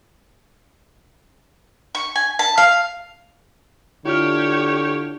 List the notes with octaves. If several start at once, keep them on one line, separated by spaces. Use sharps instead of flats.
C#6
G#5
A5
F5
D3 E4 F4 G4 C#5 F6